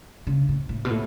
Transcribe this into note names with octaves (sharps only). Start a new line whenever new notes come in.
C#3
A2
A2
B2
A2